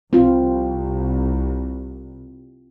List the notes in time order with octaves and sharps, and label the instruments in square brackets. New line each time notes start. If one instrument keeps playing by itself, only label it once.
[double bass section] C2 [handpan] C4 F4